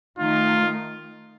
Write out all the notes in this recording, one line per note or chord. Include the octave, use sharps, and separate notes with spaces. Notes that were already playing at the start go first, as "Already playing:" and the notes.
D#3 A3 D#4 F4